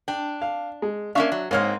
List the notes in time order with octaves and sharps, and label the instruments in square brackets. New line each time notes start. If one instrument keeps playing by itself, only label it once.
[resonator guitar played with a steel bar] D4 [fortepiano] G5
[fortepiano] F5
G#3
[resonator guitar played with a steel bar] A#3 C#4 F5 [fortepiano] D4 E5 C#6
[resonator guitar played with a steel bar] F#3
[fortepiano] G#2 C#5 F6 [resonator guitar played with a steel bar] A#3 C4 D#4